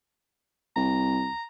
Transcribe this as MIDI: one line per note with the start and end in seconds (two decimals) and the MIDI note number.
0.76 1.28 36
0.76 1.45 82